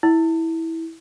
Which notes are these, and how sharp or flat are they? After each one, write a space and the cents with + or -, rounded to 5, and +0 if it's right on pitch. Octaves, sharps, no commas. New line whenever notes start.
E4 -15